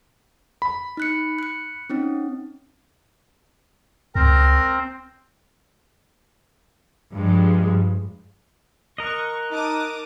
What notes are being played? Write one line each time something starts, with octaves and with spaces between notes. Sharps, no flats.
B5
D#4 F#6 C#7
F#6 C#7
C4 C#4 D#4
C#2 C4 A#4
G2 F3 G#3
A#4 D#5 C#6 F#6
D#4 A5 D6 D#6